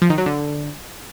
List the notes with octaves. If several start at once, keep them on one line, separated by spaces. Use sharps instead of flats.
F3
D#3
F#3
D3